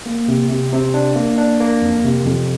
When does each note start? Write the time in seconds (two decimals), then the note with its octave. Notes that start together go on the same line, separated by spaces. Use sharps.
0.06 A#3
0.28 C3
0.50 C3
0.72 C3
0.94 D4
1.16 A#3
1.38 D4
1.60 A#3
1.82 F2
2.04 C3
2.26 F2